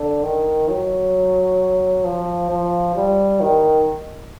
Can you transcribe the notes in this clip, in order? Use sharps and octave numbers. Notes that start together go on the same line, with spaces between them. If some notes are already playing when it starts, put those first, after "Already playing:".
Already playing: D3
D#3
F#3
F3
F3
G3
D#3